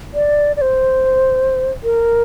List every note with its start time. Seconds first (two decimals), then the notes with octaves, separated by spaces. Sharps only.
0.14 D5
0.57 D5
0.61 C5
1.84 A#4